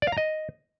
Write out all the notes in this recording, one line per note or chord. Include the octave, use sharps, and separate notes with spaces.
D5
F5
A#5
D#5